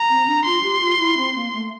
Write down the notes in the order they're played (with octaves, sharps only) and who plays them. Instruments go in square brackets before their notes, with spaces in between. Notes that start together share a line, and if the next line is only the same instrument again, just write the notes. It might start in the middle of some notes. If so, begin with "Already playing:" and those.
Already playing: [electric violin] A#5
[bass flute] C4
D4
[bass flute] F4 [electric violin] C6
[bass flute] G4
F4
E4
C4
A#3
A3